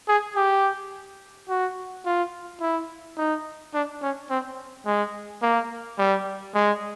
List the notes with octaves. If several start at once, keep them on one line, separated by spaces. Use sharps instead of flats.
G#4
G4
F#4
F4
E4
D#4
D4
C#4
C4
G#3
A#3
G3
G#3